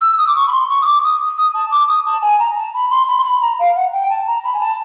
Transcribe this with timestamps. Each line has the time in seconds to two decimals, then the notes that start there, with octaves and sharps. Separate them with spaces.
0.01 E6
0.18 D#6
0.27 D6
0.36 C#6
0.48 B5
0.52 C6
0.69 C#6
0.82 D#6
0.86 D6
1.04 D#6
1.38 D#6
1.54 A5
1.71 D6
1.88 D#6
2.06 A5
2.22 G#5
2.39 A#5
2.57 A5
2.74 B5
2.91 C6
3.08 B5
3.18 C6
3.24 B5
3.42 A#5
3.59 F5
3.75 F#5
3.92 G5
4.10 A5
4.27 A#5
4.44 B5
4.54 G#5
4.60 A5